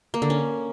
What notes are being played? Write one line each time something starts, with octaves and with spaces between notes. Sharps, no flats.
A#3
D3
C#4